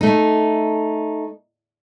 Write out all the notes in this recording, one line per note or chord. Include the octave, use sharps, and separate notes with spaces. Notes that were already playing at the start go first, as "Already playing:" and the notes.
A3 D#4